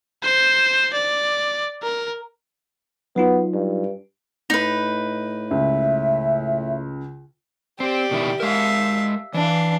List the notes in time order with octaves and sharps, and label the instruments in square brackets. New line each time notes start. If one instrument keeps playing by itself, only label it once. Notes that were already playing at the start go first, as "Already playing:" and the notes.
[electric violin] C5
D5
A#4
[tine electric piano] F#3 D#4 F4 [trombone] B3
[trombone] G2
[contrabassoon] A2 [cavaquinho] D#4 B4
[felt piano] C#2 [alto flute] E5
[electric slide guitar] C4 [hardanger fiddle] G4 D5
[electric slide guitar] B2 D#3 E4
[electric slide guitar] G#3 A#4 [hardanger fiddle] E5 F5
[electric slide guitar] E3 [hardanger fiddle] D4 F5